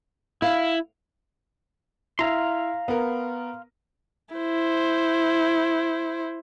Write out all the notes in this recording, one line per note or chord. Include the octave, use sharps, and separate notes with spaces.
E4 F5
E4 E5 F5 A#5 C6
B3 A#4
E4 C5